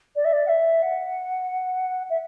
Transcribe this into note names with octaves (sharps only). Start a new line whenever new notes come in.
D5
E5
D5
F#5
E5
F#5
E5